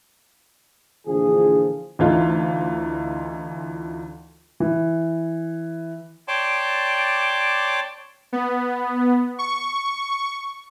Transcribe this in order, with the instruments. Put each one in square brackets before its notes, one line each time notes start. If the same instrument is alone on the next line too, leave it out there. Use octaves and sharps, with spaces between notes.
[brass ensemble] A#1 D3 E3 F3 G#4
[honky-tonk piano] D2 E3 D#4 F4 F5
[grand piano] E3
[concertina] C#5 D5 G5 A5 C6 D6
[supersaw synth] B3
C#6